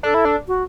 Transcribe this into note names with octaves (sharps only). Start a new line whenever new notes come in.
D4 A4
E4
D4
F#4